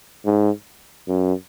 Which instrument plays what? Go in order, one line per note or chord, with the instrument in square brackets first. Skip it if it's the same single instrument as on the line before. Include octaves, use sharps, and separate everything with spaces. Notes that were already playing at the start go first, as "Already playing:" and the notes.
[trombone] G#2
F#2